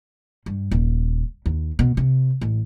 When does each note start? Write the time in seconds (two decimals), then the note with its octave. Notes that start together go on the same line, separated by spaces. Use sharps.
0.46 G2
0.71 D#1
1.46 D#2
1.79 B2
1.97 C3
2.41 A1